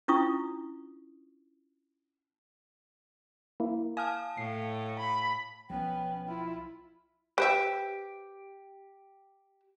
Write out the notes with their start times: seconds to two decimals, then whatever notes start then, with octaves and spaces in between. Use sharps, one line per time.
0.08 C#4 D4 E4 F4 C#6 D#6
3.60 A#3 E4
3.97 F5 G#5 A5 D#6 F6
4.38 A2 C7
4.98 B5
5.70 B1 F3 B3 C#4 G5
6.28 E4 F4
7.38 G4 B4 C5 E5